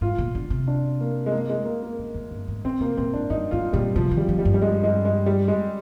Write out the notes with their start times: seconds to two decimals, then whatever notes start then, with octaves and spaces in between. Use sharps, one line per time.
0.01 G#2 F4
0.18 A#2
0.35 D3
0.50 C3
0.68 D4
1.01 A#3
1.26 G#3
1.32 A#3
1.49 G#3
1.65 A#3
1.83 A#3
1.98 G2
2.14 F2
2.31 G2
2.48 G#2
2.64 D3 C4
2.80 C3 A#3
2.97 A#2 C4
3.14 G#2 D4
3.30 G2 D#4
3.51 G2 F4
3.73 A#2 G3
3.96 C3 F3
4.11 D#3
4.17 G3
4.28 F3
4.39 G3
4.45 G2
4.54 G3
4.62 G#3
4.83 G#3
5.05 G#3
5.26 G3
5.48 G#3